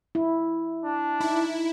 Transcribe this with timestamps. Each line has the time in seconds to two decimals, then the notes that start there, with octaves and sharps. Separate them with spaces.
0.15 E4
0.85 D4
1.20 D#4 E4